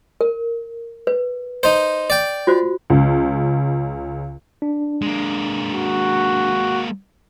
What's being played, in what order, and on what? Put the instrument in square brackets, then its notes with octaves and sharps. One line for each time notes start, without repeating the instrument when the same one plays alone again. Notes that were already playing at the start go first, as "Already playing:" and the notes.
[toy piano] A#4
B4
[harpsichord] D#4 C5
D5 G5
[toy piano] F4 F#4 C5
[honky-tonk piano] C#2
[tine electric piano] D4
[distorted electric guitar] G#3 A#3
[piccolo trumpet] F#4